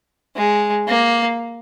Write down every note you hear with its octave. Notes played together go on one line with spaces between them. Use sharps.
G#3
A#3